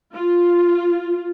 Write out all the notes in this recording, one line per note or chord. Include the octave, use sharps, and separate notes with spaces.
F4